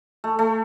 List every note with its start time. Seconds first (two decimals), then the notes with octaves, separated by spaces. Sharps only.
0.24 A3
0.39 A3